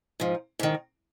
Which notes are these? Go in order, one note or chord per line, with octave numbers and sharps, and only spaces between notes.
G#2 F3
G#2 D#3